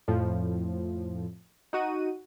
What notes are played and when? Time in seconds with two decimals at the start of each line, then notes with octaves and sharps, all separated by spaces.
0.08 F2 A2 F3
1.73 D#4 F#4 D#7